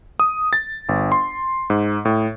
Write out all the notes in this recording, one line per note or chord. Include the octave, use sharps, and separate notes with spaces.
D#6
A6
G1
C6
G#2
A2